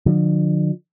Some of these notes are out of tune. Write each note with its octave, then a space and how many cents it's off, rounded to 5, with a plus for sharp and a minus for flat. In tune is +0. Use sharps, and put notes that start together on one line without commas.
D3 +35 F3 +45